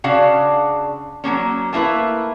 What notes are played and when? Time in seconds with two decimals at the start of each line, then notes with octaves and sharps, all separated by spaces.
0.04 C#3 D4 F#4 F5
1.24 F#3 G#3 A#3 C#4
1.73 A3 A#3 E4 B4